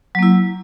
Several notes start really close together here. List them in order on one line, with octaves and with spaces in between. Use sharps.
F#3 A#3 E4